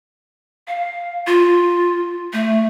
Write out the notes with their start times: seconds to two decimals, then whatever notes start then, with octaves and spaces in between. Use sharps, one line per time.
0.68 F5
1.27 F4
2.33 A3